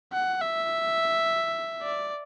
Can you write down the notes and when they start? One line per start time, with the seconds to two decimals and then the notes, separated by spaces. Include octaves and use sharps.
0.13 F#5
0.42 E5
1.83 D5